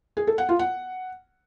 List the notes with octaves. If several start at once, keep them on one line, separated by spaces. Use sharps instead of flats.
G#4
A4
F#5
F4
F#5